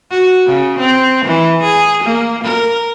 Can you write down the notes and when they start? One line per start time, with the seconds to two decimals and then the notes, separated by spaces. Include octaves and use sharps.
0.11 F#4
0.46 C#3
0.79 C4
1.25 E3
1.63 G#4
2.03 A#3
2.44 A#4